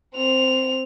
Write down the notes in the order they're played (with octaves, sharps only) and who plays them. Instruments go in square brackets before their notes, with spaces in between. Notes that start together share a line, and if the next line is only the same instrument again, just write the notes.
[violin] C4 F7